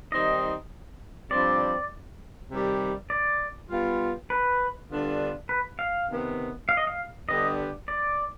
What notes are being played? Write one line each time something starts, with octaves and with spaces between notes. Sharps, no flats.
D#3 G3 C4 D#4 D#5
G2 F3 C4 D5
C3 D#3 G3
D5
G3 B3 F4
B4
D3 G3 B3 D4 F4
B4
F5
C3 D#3 B3
F5
D#5
F5
D3 G3 B3 D4 G4 D#5
D5